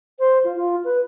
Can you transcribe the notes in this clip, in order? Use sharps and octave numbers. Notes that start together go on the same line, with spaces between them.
C5
F4
F4
B4